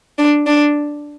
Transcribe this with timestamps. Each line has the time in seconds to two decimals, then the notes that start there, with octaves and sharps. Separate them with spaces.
0.18 D4
0.47 D4